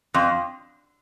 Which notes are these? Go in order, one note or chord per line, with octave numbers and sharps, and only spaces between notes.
F2